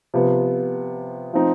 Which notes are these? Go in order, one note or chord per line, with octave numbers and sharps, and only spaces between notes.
C3 F3 B3
F3 C4 D#4